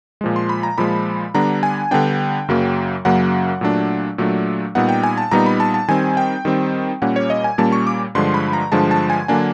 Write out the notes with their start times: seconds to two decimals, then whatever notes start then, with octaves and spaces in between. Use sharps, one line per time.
0.21 A#2 F3 G#3
0.36 C6
0.49 B5
0.63 A#5
0.78 A#2 F3 G#3 B5
1.34 D3 G3 B3 D4 A#5
1.63 G#5
1.91 D3 G3 B3 D4 G5
2.49 F#2 C#3 F#3 A#3
3.05 F#2 C#3 F#3 A#3 F#5
3.61 A#2 F#3 A3 D4
4.18 A#2 F#3 A3 D4
4.75 A#2 G3 B3 D#4 F#5
4.89 G5
5.03 G#5
5.18 A5
5.31 A#2 G3 B3 D#4 A#5
5.46 B5
5.60 A5
5.74 A5
5.88 D#3 G3 C4 G#5
6.17 G5
6.45 D#3 G3 C4
7.02 A#2 G3 A#3 C#4 F#5
7.16 C#5
7.30 D#5
7.44 G#5
7.58 A#2 G3 A#3 C#4 A5
7.72 C#6
7.87 D6
8.15 G2 D3 F3 G#3 C6
8.34 B5
8.53 A#5
8.72 G2 D3 F3 G#3 A5
8.91 A5
9.10 G#5
9.28 D3 F#3 A#3 D4 G#5